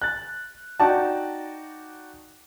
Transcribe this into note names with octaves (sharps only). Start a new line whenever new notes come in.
F#6 A6
D#4 F#4 D5 G5 A5